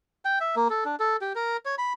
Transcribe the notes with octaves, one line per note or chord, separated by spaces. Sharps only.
G5
E5
A#3
A4
D4
A4
G4
A#4
C#5
B5